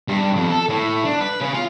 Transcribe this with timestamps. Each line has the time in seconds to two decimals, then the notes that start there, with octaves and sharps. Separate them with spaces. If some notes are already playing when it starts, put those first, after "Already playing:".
0.08 G2
0.36 F2
0.50 A4
0.69 A2
1.05 D4
1.21 B4
1.41 C#3
1.54 F4